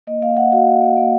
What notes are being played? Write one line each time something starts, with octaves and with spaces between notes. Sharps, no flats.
A#3 D#5
A#3 F5
A#3 F#5
F#4 F5
A#3
A#3
A#3